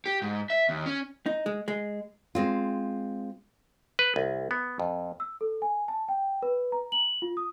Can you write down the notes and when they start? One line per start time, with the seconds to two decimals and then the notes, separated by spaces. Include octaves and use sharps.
0.06 G4
0.22 G#2
0.50 E5
0.69 D#2
0.86 C#4
1.26 D#4
1.46 G#3
1.68 G#3
2.35 G#3 C4 F4
3.99 B4
4.16 C2
4.51 B3
4.79 F2
5.20 E6
5.41 A4
5.62 G#5
5.88 A5
6.08 G5
6.43 B4
6.72 A#5
6.92 F#7
7.22 F4
7.37 D#6